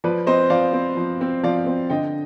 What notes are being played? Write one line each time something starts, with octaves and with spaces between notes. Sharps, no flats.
F3 B4 D5
C4 C5 D#5
F3 D5 F5
C4
F3
C4
F3 D5 F5
C4
D3 D#5 G5